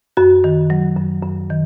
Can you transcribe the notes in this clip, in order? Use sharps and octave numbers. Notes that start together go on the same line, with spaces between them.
F#2 F#4
D#3
F#3
F#2
F#2
D#3